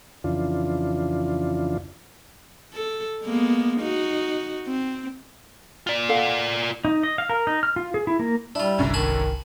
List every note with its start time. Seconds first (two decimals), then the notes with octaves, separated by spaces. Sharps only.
0.24 F2 C#3 E3 D4 F4
2.74 A4
3.23 G#3 A#3 B3
3.81 D#4 F#4
4.67 C4
5.87 F4 D5
6.09 A4 F5 F#5
6.85 D#4
7.03 D#5
7.18 F5
7.30 A#4
7.47 D#4
7.63 F6
7.76 F4
7.94 G#4
8.07 E4
8.19 A#3
8.55 G3 D4 E4 F4
8.79 G1 C2 F#2 D3 C#4
8.94 D#3 G#5 A5 B5